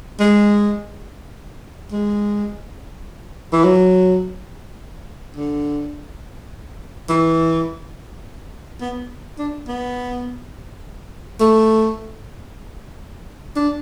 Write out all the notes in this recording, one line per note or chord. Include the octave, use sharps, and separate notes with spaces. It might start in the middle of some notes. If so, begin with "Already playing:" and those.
G#3
G#3
E3
F#3
D3
E3
B3
D4
B3
A3
D4